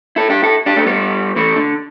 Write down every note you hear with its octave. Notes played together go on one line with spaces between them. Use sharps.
E4 A4
D4 G4
E4 A4
D4 G4
A3 D4
G3 B3
E3 A3
D3